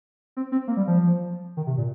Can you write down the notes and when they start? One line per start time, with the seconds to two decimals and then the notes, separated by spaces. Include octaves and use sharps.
0.37 C4
0.52 C4
0.68 A#3
0.77 G3
0.87 F3
1.57 D#3
1.67 C3
1.78 A#2